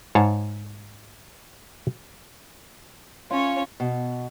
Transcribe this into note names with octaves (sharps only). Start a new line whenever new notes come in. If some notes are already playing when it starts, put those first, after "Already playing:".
G#2 C#5 F5 A5
C#4 F4 C#5
B2